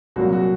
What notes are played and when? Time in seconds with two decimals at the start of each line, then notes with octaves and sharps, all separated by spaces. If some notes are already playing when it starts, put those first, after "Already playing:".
0.16 C2 A#2 F#3 F#4
0.33 F#4